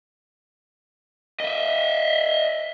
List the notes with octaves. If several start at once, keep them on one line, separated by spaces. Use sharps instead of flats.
D#5 E5